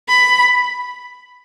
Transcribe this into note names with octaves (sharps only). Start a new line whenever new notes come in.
B5